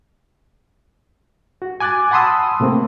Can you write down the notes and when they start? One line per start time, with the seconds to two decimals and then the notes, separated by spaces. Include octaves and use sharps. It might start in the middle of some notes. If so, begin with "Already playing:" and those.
1.62 F#4
1.80 G#5 D6 F#6 G#6 A6
2.11 F#5 A5 B5 C6 D#6 E6
2.60 A2 C3 A3 A#3 C4